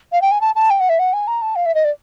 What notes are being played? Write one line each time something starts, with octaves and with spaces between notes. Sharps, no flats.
F5
G5
G#5
A5
A5
G5
F#5
E5
F#5
G#5
A#5
A5
F5
E5
D#5
D5